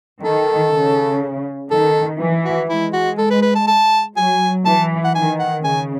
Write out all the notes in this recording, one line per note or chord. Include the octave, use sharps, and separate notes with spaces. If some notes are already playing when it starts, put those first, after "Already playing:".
D#3 A4
C#3
D#3 A4
E3
F#4
G#3 E4
F#4
A4
B4
B4
A5
A5
F#3 G#5
E3 A5
F#5
D#3 G#5
F#5
C#3 G#5